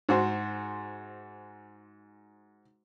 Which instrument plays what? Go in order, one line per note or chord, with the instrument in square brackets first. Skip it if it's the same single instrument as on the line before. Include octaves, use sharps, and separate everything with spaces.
[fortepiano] G#2 F#4 C5